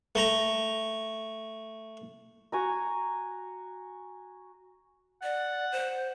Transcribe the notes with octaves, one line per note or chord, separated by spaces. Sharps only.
A3 A#5
F#4 G#5 A#5
D5 F#5
C5